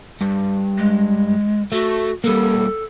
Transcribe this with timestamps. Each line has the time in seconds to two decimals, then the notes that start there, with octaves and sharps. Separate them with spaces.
0.21 G2
0.78 G#3
1.72 A3 F#4
2.24 G3 A#3 A4